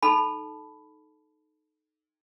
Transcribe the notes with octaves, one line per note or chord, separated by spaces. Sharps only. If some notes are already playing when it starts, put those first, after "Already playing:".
D#4 A4 A5 B5